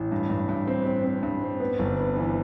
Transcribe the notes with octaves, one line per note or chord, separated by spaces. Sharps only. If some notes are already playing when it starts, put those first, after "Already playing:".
Already playing: A1
G2
G2
G2
C4
C4
C4
G2
C4
B3
G1
B3
E3